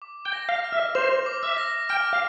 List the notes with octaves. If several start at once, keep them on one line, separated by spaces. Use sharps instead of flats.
D6
G5
A#6
F5
F6
E5
C5 F7
D6
E5
A#6
G5 F6
F5